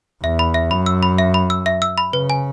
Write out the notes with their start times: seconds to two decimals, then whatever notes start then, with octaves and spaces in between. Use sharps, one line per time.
0.23 E2 E5
0.39 B5
0.54 E5
0.71 F#2 B5
0.86 E6
1.03 B5
1.18 E5
1.34 B5
1.50 E6
1.66 E5
1.82 E6
1.98 B5
2.13 C#3 B4
2.30 G#5